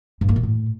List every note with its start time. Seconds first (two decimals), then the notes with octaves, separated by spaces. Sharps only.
0.21 G2
0.29 A#3
0.36 B2
0.43 A2